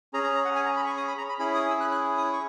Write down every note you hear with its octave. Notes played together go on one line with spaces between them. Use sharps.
C#4 G#4 A#5
A#5
A#5
F#5
G#5
A#5
B5
C#6
D#6
B5
A#5
B5
C#4 E4 G#4 B5
D#6
E6
F#6
F#6
D#6
C#6